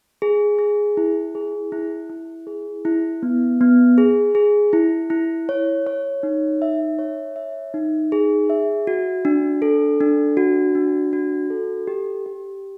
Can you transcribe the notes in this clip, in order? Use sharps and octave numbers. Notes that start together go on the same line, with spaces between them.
G#4
G#4
E4
G#4
E4
E4
G#4
E4
B3
B3
G#4
G#4
E4
E4
C#5
C#5
D#4
E5
C#5
E5
D#4
G#4
E5
F#4
D4
A4
D4
F#4
D4
F#4
A4
G4
G4